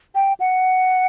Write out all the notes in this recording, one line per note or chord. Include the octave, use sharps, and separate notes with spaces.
G5
F#5